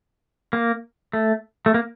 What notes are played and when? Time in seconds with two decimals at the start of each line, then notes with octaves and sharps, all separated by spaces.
0.53 A#3
1.13 A3
1.66 A3
1.74 A#3